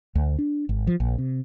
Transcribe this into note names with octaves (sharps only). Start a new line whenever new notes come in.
D2
D4
G#1
F3
A#1
C3